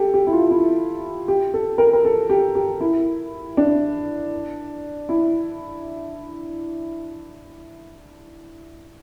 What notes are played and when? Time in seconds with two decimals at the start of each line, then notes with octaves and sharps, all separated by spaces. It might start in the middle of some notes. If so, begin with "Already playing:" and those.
Already playing: G4 A4
0.14 G4
0.27 E4
0.32 F4
0.51 E4
1.28 G4
1.54 A4
1.78 A#4
1.93 A#4
2.05 A4
2.30 G4
2.55 G4
2.80 E4
3.57 D4
5.09 E4